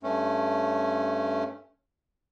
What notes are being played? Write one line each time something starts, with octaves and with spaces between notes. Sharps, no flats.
G2 A3 C#4